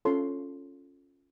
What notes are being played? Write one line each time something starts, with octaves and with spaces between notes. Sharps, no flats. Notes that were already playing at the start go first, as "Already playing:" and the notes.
C#4 F4 A4 C#5 C6